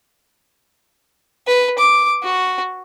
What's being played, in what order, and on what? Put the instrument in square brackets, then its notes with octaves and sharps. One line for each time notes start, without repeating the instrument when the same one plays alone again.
[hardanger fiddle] B4
D6
F#4